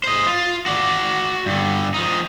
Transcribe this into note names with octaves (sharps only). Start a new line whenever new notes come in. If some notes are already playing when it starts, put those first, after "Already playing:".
C5 D#5
F4
F#4 D5
G2 D3
F3 D#4